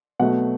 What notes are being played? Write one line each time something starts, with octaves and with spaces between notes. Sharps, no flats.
B2 F#3 A3 F#5